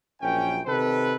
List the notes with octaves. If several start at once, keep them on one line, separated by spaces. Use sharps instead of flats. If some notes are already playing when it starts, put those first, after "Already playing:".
A#1 F#2 C#4 G5
C3 D#3 A4 B4